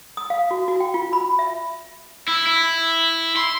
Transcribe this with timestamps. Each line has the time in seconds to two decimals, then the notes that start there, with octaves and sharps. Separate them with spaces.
0.17 D#6
0.30 F5
0.51 F#4
0.68 F#4
0.80 G5
0.94 F4
1.13 B5
1.39 E5
2.28 E4
2.47 E4
3.36 C6